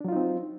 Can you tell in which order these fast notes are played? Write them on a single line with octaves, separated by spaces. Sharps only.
D4 F#3 F4 D#4 C4